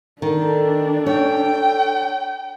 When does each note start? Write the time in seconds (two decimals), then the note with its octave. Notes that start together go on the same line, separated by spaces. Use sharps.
0.22 D#3 D4 A4
1.06 C#5 G5